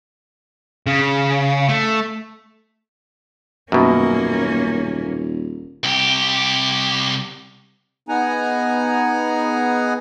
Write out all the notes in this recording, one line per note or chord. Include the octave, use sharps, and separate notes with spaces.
C#3
A3
D#1 F#2 B2 A#3 C#4
C2 G4
B3 D#4 G#4 F#5 G#5 A#5